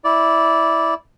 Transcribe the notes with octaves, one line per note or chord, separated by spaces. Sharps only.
E4 D5